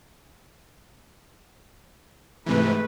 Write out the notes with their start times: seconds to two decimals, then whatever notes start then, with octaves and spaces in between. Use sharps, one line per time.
2.46 G#2 C3 E3 G#3 A3 B4